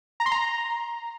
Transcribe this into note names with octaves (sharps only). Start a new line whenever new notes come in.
A#5
C6
A#5